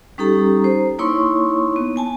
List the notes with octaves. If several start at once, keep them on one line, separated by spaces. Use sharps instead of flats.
G3 C#4 D#4 G4 A4 A#5
C5
A#3 D#4 E4 C#5 C6 C#6
B3
B3 G#5 A5